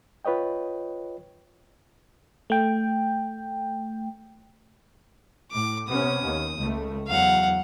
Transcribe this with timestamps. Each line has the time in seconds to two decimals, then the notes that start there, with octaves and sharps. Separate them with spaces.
0.25 F4 B4 C#5 D#5 G5
2.50 A3 G5
5.52 A2 D6
5.89 C3 B3 C#4 D#6
6.24 D#2
6.58 C#2 A3
7.08 E2 F#3 F5 F#5